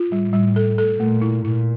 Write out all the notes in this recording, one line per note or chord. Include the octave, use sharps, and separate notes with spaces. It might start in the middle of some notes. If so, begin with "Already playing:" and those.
Already playing: F4
A2 G3
G3
A4
A4
A#2 A3
E4
A#2 E4